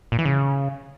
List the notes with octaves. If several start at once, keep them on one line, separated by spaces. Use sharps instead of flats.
A#2
E3
C#3